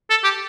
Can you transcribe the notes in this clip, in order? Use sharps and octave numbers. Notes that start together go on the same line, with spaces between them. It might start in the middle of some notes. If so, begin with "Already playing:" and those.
A4
G4